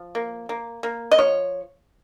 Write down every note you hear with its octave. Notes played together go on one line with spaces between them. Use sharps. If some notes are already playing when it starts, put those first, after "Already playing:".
Already playing: F3
A#3
A#3
A#3
D#5
F3 C#5